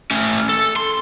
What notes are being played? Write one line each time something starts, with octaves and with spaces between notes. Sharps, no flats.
A3 C#4
A4
C6